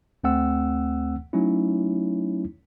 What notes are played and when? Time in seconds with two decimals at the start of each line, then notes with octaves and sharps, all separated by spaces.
0.24 D2 A3 C4 F#5 E6
1.33 F#3 A3 C#4 D#4 E4